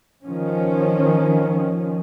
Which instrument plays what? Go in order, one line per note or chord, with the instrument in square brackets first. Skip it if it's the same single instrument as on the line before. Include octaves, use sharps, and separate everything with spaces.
[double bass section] D#3 F3 C#4